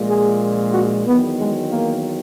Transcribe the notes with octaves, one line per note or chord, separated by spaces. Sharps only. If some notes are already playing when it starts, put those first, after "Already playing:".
Already playing: A#1 A#2 G#3
G#4
F#4
E2 D#3 F#3 B3
G#3
A#3